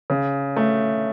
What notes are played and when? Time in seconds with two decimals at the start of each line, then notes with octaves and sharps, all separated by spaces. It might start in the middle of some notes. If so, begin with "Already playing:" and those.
0.10 C#3
0.56 A3